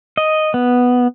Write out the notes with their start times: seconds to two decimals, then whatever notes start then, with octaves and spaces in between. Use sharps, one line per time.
0.17 D#5
0.54 B3